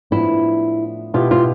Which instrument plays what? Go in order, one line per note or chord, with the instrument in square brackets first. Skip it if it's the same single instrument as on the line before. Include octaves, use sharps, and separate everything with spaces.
[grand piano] A2 F3 B3 D4 [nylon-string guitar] E4
[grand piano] B2 B3 E4 G4 [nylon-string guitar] F4
[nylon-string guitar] F4